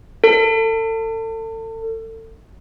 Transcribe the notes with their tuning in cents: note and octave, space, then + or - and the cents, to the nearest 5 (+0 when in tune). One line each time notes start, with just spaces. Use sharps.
A4 +35